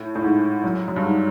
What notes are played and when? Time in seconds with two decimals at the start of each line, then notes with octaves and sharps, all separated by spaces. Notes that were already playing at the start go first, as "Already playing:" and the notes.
Already playing: A2
0.15 A2
0.23 G#2
0.64 F#2
0.88 F#2
0.96 G2
1.04 G#2